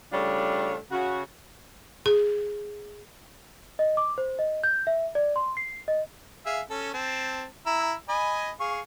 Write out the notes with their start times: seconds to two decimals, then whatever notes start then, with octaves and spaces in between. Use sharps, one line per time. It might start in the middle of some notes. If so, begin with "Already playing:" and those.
0.13 C#3 G3 A3 D4 F4 C#5
0.92 C#3 F#4
2.06 G#4
3.79 D#5
3.97 D6
4.18 C5
4.39 D#5
4.64 G6
4.87 E5
5.15 D5
5.36 C6
5.57 C7
5.88 D#5
6.46 G#4 E5 F5
6.70 C#4 A4
6.94 C4 A5
7.66 E4 A#5 E6
8.09 D#5 G#5 B5
8.60 G#4 F5 C#6